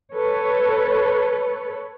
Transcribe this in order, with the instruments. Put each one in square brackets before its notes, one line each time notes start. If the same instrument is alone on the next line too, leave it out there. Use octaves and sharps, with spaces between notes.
[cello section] A4 B4 C#5